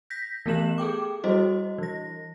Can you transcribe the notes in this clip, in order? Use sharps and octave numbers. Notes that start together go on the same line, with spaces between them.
G6 A#6 B6
E3 A3 B3 G4 E7 F#7
G#4 A4 G5 D6
G3 E4 F#4 C5 D#5
E3 A#6